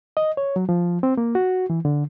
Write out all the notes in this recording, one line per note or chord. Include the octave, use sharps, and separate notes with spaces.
D#5
C#5
F#3
F3
C4
A#3
F#4
E3
D3